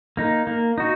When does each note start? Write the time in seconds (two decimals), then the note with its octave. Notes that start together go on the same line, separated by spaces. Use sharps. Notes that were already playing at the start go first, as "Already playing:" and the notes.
0.17 A#3 D#4
0.47 A#3
0.78 D#4 F#4